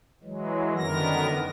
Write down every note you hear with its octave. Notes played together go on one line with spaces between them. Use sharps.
E3 F#3 G#3
F#2 D3 D#3 B3 A#4 A#6